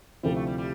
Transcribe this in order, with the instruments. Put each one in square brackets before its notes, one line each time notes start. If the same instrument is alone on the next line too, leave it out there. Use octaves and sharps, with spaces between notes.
[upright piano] D2 C3 F3 C4 E4 [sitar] G3
[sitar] A3
G3
G3